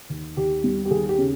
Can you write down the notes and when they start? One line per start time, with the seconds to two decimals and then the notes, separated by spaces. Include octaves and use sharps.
0.10 D#2
0.37 D#2 G4
0.64 G3
0.85 G4
0.91 D#2 G#4
1.09 G4
1.18 C#3